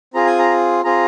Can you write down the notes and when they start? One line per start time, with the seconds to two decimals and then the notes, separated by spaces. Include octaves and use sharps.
0.14 C4 F4 G#4 A#5
0.26 G#5
0.39 A#5
0.84 C4 F4 G#4 A#5